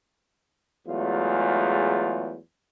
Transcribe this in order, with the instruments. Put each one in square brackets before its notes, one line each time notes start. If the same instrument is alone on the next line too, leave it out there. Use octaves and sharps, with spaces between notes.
[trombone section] E2 F#3 G#3 A3 F4